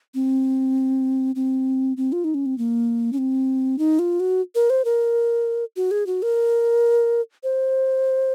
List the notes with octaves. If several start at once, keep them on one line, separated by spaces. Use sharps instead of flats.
C4
C4
C4
F4
D#4
C#4
C4
A#3
C#4
C4
D#4
F4
F#4
A#4
C5
A#4
F#4
G#4
F#4
A#4
C5